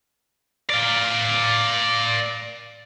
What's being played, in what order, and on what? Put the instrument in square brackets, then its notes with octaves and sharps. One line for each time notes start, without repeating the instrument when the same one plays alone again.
[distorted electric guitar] D5 F5